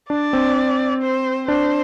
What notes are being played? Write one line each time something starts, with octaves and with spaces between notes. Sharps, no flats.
D4 D5
C4
C5
D4 C5